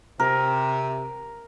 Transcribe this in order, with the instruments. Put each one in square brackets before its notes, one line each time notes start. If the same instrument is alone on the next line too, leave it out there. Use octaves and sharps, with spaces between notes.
[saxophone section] C3 [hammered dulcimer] A#4